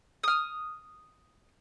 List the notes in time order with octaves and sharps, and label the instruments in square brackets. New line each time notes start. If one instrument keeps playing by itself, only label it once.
[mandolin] D#6 F6